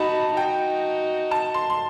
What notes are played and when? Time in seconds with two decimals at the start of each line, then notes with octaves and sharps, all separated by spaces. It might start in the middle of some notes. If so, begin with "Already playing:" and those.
Already playing: D#4 F#4 A5 B5
0.37 D#4 F#4 G5
1.31 A5
1.54 C6
1.70 C6